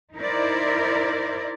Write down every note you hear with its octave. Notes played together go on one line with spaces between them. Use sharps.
D#4 E4 A#4 C5 D5